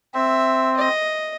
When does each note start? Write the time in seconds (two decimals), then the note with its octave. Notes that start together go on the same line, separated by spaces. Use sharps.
0.14 C4 E5
0.77 D#5